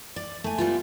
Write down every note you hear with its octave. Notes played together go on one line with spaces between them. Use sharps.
D5
A3 G#5
G3 B3 F4